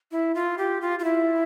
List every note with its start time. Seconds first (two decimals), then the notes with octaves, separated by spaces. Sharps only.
0.12 E4
0.35 F4
0.58 G4
0.81 F4
0.99 F4
1.04 E4